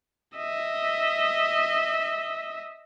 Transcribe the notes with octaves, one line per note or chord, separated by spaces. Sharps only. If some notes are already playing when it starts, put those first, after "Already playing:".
D#5 E5